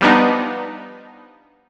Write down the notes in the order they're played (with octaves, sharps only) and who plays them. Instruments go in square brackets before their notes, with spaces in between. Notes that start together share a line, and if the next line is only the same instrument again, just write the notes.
[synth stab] F3 G3 B3 D4 D#4